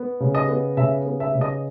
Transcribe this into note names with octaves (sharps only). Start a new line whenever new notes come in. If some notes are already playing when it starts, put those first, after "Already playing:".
Already playing: B3
C#3
D#5
B3
C#3 E5
B3
E5
C#3
D#5